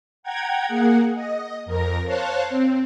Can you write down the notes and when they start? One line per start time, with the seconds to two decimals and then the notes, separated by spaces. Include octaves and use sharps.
0.23 F#5 G5 A#5 G#6
0.67 A#3 G#4 F#5
1.14 D#5
1.66 F2 A#4 A#6
2.05 C5 C#5 F5 A5 F#6
2.49 C4